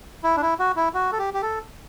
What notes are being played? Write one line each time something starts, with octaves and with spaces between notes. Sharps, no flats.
E4
D4
E4
F#4
E4
F#4
A4
G4
G4
A4